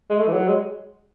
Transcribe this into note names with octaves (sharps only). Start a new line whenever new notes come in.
G#3
A3
E3
F#3
G#3